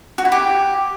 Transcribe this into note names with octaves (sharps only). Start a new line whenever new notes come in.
F#4
E4
G4